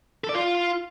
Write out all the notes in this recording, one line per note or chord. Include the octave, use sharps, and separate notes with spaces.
A4
D5
F4